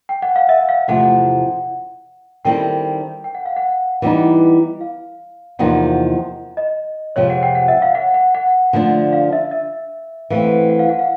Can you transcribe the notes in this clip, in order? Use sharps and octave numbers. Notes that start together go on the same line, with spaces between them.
G5
F#5
F5
E5
F5
E2 C3 F3 A3 F#5
D#3 G3 C4 E4 A4 G5
G5
F#5
F5
F#5
E3 G3 B3 D#4
F5
E2 C3 F3 A#3 D#4 F#5
D#5
F2 C3 F3 G#3 C#5
F#5
G5
F#5
E5
F5
F#5
F#5
F#5
D3 F3 A3 D4
F5
E5
E5
E3 A3 C4 F5
F#5
F#5
F5
F#5
F5